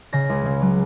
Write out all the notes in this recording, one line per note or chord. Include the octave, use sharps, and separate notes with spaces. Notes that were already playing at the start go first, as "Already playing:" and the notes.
C#3 A#6
C#2
C#3
F#3